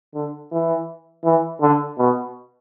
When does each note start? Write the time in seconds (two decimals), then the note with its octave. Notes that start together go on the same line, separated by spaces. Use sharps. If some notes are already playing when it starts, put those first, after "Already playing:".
0.14 D3
0.51 E3
1.24 E3
1.61 D3
1.98 B2